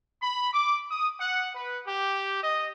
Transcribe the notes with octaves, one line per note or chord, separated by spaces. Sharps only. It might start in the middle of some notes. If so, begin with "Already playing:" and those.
B5
D6
D#6
F#5
B4
G4
D#5